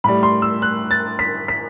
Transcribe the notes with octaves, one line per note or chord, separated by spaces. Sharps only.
A2 G3 B5
C6
E6
F#6
A6
B6
B6